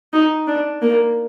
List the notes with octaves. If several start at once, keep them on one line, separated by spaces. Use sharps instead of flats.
D#4
D4
A#3